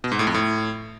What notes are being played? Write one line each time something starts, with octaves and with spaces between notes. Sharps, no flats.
B2
G#2
A2
F2
A2